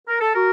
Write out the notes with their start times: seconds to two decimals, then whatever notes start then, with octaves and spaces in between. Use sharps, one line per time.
0.08 A#4
0.21 A4
0.35 F#4 A#4